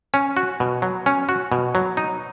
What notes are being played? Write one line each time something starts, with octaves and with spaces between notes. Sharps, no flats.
C#4
F#4
B2
F#3
C#4
F#4
B2
F#3
D#4